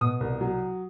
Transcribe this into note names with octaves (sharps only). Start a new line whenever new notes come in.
B2 D#6
C2
F#3